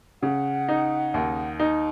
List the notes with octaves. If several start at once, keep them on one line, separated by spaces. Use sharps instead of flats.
C#3 F#5
D#4
D#2
D#4